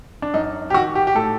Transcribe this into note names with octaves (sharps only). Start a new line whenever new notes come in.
D4
F#2 D#4
G4
D#3 F#4
G4
G4
A2 A4